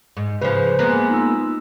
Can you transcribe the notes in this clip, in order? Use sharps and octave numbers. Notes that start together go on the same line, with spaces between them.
G#2
C#3 F3 B4 C5
G#3 A#3 B3 A#5 F#6 A#6
D#4 F4 E6